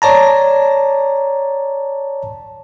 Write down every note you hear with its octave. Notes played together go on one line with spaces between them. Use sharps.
C#5 D5 A5 A#5